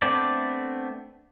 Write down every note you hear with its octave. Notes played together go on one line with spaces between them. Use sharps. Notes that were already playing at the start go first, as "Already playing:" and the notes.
A3 B3 C4 D4 D5